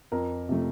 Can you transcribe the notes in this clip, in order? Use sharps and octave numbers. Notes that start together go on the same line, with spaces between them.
F2 A#4
C3 F3 A3